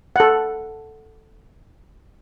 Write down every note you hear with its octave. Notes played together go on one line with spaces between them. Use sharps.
A4 F#5